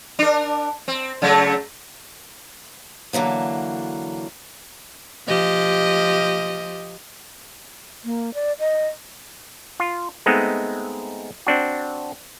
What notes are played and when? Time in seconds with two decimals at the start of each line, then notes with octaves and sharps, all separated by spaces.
0.19 D4 A#4
0.88 C4
1.22 C#3 F#3 A3
3.13 D3 E3 F#3 A#3
5.27 F3 G4 D#5
8.05 A#3
8.34 D5
8.59 D#5
9.80 F4
10.26 G#3 A3 B3 C4 D#4
11.47 C4 D4 F#4